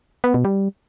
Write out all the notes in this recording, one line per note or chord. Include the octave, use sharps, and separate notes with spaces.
B3
B2
G3